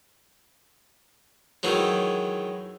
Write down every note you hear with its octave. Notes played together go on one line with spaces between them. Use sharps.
D#3 E3 F#3 G#3